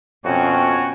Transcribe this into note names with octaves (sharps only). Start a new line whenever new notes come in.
F2 B2 C#4 F#4 C#5 G5